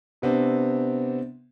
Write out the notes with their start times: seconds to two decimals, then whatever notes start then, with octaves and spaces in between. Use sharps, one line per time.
0.22 C3 B3 C4 D4